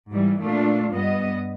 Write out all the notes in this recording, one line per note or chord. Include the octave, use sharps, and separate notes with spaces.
G#2 E3 G3
A#2 A3 D4 F4
G2 G3 B3 D#5